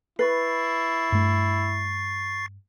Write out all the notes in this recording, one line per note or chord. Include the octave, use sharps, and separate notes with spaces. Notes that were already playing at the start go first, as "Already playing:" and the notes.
E4 B4 C#6 A6 C7
G2 A3